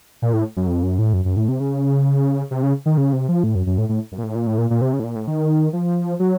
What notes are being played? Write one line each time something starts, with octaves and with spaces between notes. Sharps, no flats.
A#2
A2
F#2
F2
F#2
A2
F#2
F#2
A2
C3
C#3
C3
C#3
D#3
C#3
C3
F3
A2
F#2
F#2
A2
A2
F#2
A#2
A2
A#2
A2
A#2
A#2
C3
C#3
A2
A#2
A2
D#3
F3
F#3